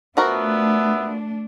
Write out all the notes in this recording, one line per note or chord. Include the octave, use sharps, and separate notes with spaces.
F3 A3 B3 D4 F#4 A#4 E5